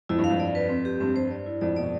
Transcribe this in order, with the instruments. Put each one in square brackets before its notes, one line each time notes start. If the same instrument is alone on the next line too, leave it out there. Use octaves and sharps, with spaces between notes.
[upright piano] F2 [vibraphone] E4
[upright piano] G2
[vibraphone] F5
[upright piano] F2
[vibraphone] D5
B4
C4
G4
[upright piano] G2 [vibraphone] C4
[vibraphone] C5
D5
E4
[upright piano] F2 A2 [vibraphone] D5
[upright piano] B2 [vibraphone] D5